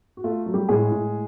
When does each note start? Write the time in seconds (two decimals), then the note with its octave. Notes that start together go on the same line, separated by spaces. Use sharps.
0.17 F#4
0.24 A3 F4
0.46 F#3
0.54 G3 G4
0.69 A2 G#3 G#4
0.91 A2